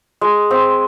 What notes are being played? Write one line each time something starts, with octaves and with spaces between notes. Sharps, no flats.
G#3
C4